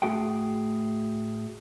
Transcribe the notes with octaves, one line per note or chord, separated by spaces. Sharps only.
A2 A3 F#4 G#4 F#5 G5